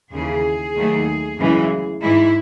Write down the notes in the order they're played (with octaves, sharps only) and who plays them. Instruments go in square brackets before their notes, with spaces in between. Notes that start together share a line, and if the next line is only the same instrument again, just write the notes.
[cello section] D#2 C#3 E3 G#4
D#2 D#3 F#3 A3
F#2 C#3 E3 G#3
G#2 E3 G#3 E4